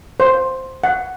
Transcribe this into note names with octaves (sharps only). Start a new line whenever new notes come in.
C5
F#5